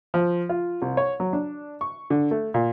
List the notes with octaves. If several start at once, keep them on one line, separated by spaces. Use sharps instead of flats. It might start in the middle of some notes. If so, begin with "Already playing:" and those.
F3
F4
C2
C#5
F#3
D4
C#6
D3
A3
A#2